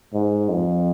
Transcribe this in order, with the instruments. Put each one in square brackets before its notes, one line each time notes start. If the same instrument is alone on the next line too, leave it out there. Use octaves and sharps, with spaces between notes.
[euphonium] G#2
F2